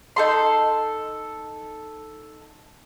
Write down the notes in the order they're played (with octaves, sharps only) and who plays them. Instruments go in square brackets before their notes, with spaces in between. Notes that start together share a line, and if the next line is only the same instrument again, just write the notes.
[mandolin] D#4 A4 C6